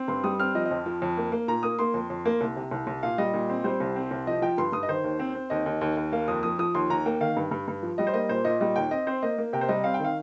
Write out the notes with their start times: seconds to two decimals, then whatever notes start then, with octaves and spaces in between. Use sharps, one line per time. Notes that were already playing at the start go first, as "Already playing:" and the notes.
Already playing: C4
0.08 G2 C6
0.24 G3 D#6
0.39 C4 F6
0.55 F3 D#5
0.65 D#5
0.71 F2
0.86 F3
1.02 F2
1.17 A#3
1.32 A#3
1.48 A#2 A#5
1.63 A#3 D#6
1.79 A#3 C6
1.94 F2
2.10 F2
2.25 A#3
2.41 C2
2.56 C3
2.71 C2
2.87 C2
3.03 A#2 F5
3.18 G3 D#5
3.34 A#2
3.49 C4
3.64 G3 C5
3.80 C2
3.96 C4
4.11 C2
4.27 F3 D#5
4.42 F3 G5
4.58 G2 C6
4.73 G2 D#6
4.83 D#5
4.88 D#3 C5
5.04 D#2
5.19 C4
5.35 C4
5.50 D#2 D#5
5.66 D#2
5.81 D#2
5.97 D#2
6.12 A#3 F5
6.28 F2 D#6
6.43 F3 D#6
6.59 F3 D#6
6.75 D#2 C6
6.90 D#2 A#5
7.06 A#3 G5
7.20 D#3 F5
7.37 G2
7.51 G2
7.68 G2
7.83 F3
7.98 G3 D#5
8.07 C5
8.14 A#3 D#5
8.29 A#2 C5
8.45 A#2 D#5
8.60 G3 D#5
8.76 D#2 G5
8.91 C4 D#5
9.07 C4 C5
9.22 A#3 D#5
9.38 A#3
9.53 C3 G5
9.61 C5
9.69 G3 D#5
9.84 C4 F5
9.94 G5
10.00 D#3 F5